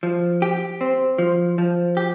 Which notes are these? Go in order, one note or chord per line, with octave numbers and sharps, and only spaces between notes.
F3
G4
C4
F3
F3
G4